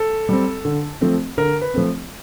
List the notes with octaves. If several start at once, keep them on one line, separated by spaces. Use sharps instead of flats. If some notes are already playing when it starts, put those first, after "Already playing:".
Already playing: A4
G3 C4
D3
F3 A3 C4
D3 A#4
B4
F3 A3 C4